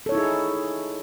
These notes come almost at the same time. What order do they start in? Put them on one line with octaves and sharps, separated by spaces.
A4 C#5 E4 D#4 G#4